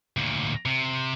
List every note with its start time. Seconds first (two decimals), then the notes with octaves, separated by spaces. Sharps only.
0.17 D2 A#2
0.65 C3